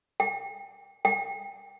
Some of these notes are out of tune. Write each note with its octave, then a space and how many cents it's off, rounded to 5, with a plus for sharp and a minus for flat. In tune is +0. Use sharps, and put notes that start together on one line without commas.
G5 +25
G5 +25